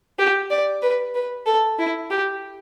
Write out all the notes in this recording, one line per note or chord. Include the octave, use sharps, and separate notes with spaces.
G4
D5
B4
B4
A4
E4
G4